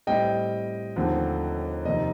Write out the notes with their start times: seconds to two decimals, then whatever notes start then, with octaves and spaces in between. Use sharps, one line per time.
0.07 A2 G3 C4 D#5 G5
0.96 D#2 D3 F3 A3 C4
1.85 F2 C3 D#3 A#3 D#4 D#5